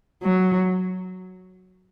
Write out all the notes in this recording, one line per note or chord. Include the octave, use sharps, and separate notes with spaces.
F#3